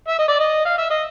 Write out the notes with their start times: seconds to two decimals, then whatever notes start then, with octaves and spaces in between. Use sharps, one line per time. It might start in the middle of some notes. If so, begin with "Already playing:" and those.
0.08 E5
0.19 D#5
0.28 D5
0.39 D#5
0.65 F5
0.78 E5
0.90 D#5